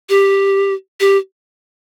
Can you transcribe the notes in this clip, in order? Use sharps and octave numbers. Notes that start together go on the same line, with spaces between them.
G4
G4